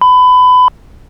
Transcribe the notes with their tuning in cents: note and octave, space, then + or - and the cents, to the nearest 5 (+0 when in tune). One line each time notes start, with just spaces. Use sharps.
B5 +25